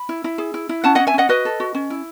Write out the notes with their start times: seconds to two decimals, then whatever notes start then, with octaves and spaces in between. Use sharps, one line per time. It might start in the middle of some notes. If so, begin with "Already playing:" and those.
Already playing: B5
0.09 E4
0.24 E4
0.38 G#4
0.54 E4
0.69 E4
0.84 C#4 F#5 A5
0.95 D#5 F#5
1.00 C#4
1.07 E5 G#5
1.14 C#4 D#5 F#5
1.29 F#4 B4 D#5
1.45 A4
1.60 F#4
1.75 C#4
1.90 E4